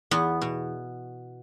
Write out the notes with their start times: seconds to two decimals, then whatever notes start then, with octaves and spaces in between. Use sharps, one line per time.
0.11 E2 B3
0.41 B2